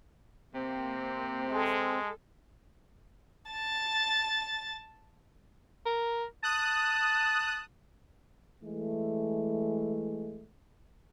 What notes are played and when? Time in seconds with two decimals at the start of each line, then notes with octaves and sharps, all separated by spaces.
0.55 C3 A#3 C4
1.49 G#3 A4
3.50 A5 A6
5.86 A#4
6.43 A5 D#6 F#6
8.64 E3 G#3 A3